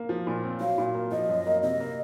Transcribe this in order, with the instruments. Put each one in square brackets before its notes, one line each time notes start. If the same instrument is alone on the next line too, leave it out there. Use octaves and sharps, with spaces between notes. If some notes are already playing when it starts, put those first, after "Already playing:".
Already playing: [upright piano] A#3
F3
A#2
C4
[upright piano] F#3 [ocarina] F5
[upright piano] A#2
A#3
[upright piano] F3 [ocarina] D#5
[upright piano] F#2
A#3
[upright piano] C3 [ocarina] D#5
[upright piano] A#3